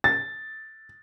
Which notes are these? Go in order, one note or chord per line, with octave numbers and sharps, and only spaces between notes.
A6